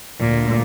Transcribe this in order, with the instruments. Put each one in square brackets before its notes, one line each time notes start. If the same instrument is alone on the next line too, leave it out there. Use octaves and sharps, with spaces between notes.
[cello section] D2 D3 G3 [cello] A#2